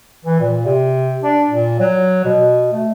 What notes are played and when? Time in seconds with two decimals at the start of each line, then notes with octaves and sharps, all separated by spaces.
0.25 E3
0.40 A#2
0.65 C3
1.23 D4
1.51 A#2
1.79 F#3
2.25 B2
2.72 A3